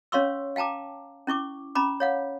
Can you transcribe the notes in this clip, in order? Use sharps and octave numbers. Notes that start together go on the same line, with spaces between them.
C#4 C#5 F5 C6 C#6 E6
F5 G5 A5 A#5 D6
C#4 E4 C#6 D6
C#4 A#5 B5 D6
C#5 F5 F#5